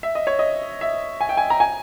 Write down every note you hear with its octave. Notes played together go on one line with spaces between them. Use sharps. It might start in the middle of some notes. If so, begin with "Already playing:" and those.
E5
D#5
C#5
D#5
E5
G#5
G5
G#5
A#5
G#5